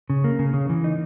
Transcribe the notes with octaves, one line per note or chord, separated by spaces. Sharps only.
C#3
A#3
C#3
C#3
E3
D#4